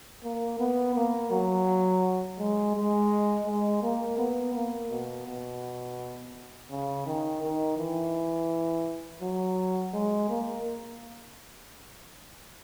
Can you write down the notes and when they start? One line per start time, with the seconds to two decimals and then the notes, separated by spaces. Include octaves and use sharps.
0.24 A#3
0.60 B3
0.96 A#3
1.31 F#3
2.39 G#3
2.75 G#3
3.47 G#3
3.83 A#3
4.18 B3
4.55 A#3
4.90 B2
5.26 B2
6.70 C#3
7.06 D#3
7.42 D#3
7.78 E3
9.22 F#3
9.94 G#3
10.30 A#3